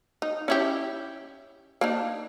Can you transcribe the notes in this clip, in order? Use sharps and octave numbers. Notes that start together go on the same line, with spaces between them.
D#4
C#4 E4 G4
A#3 D4 D#4